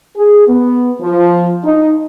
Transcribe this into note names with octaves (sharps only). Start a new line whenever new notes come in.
G#4
B3
F3
D#4